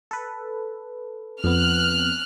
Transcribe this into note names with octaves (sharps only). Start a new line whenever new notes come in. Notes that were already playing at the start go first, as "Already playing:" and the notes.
A4 B4
F2 B3 F6 F#6